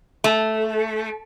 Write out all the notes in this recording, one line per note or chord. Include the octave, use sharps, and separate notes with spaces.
A3